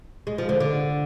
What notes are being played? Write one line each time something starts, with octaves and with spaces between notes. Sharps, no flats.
G#3
F3
D3
D3